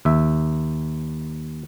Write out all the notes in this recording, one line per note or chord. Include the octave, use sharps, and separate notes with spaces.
D#2 E5